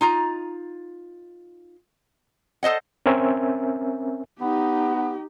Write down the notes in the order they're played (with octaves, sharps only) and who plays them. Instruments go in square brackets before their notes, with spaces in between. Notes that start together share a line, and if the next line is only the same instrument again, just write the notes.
[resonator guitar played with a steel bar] D#4 F4 A#5
A4 C5 D#5 F#5
[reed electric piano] C4 C#4 A#4 E5 G#5
[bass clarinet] B3 [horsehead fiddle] D#4 G4